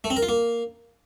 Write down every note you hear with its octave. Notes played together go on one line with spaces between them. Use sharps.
A3
C4
A#4
F4
A#3